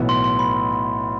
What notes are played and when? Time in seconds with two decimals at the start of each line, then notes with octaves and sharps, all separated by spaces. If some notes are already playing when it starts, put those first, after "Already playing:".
Already playing: B1 A2 E3 B3
0.09 C6
0.24 C6
0.39 B5